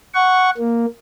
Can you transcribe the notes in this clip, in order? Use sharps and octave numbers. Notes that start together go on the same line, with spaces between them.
F#5 C#6
A#3